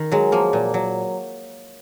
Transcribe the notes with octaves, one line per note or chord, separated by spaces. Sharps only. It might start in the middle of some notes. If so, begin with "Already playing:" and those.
Already playing: D#3
F#3 G#3
F3 A#3
A#2
F#3